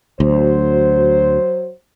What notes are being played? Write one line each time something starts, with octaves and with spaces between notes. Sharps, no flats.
D2 F#3 C5